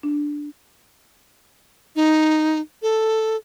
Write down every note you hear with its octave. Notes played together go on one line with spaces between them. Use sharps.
D4
D#4
A4